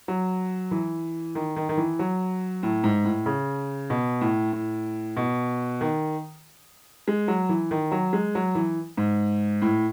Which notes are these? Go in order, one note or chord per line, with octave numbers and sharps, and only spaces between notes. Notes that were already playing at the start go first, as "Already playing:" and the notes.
F#3
E3
D#3
D#3
D#3
E3
F#3
A2
G#2
A2
C#3
B2
A2
A2
B2
D#3
G#3
F#3
E3
D#3
F#3
G#3
F#3
E3
G#2
A2